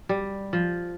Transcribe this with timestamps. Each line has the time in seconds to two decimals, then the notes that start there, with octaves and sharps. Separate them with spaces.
0.09 G3
0.53 F3